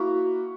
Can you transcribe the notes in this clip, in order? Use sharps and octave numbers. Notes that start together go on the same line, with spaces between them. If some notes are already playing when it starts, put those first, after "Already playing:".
Already playing: A#3 E4 F#4